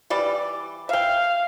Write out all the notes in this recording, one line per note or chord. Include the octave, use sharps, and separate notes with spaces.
E3 G3 D5
E5 F5 G5